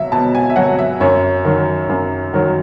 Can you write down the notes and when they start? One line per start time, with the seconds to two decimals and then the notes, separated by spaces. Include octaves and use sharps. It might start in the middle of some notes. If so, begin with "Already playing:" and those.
Already playing: B2 F#3 E5
0.12 B2 A5
0.35 G#5
0.50 E5
0.56 F#3 F#5
0.79 E5
1.00 F#2 C#5
1.45 D#3 F#3
1.89 F#2
2.33 D#3 F#3